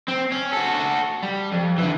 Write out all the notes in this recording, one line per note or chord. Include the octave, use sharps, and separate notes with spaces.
C4
C#4
F#4 A4
G3
F2
D3 E3